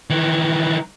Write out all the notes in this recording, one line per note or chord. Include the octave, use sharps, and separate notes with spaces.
D#3 E3